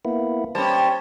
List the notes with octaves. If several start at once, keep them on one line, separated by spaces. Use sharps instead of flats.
A#3 B3 E4
G3 C#4 C5 A5